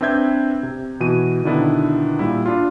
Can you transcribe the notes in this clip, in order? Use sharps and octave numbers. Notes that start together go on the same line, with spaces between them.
C4 D4 B4 E5 G6 G#6
C3
B2 E3 F#4 D#7
B2 D3 D#3 B3 D4 E4
A#2 G3 E4
D4 F4